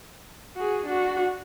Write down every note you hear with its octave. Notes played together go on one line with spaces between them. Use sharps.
F#4 G#4
D4 F#4